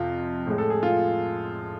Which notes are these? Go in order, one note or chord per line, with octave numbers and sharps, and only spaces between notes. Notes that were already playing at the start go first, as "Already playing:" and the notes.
Already playing: F2 C3 F4
A2 G#3
A4
G#4
F4